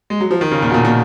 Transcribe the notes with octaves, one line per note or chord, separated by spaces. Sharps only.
G#3
F#3
F3
D#3
C#3
A#2
B2
A#2
A#2